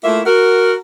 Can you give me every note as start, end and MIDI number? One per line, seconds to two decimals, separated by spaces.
0.04 0.21 57
0.04 0.21 58
0.04 0.21 64
0.04 0.21 65
0.04 0.21 76
0.25 0.75 66
0.25 0.75 70